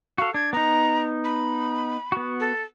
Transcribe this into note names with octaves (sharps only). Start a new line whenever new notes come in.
F#4 A4 F5
D4 G#6
B3 D#4 A#5
B5
B3 F#4
A4